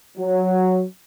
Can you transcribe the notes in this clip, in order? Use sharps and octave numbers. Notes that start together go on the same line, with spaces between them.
F#3